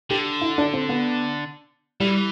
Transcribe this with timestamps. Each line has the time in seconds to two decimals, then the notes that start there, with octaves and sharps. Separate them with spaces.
0.10 D3 G4
0.41 E4
0.58 D4
0.74 C4
0.89 B3
2.00 E3 G3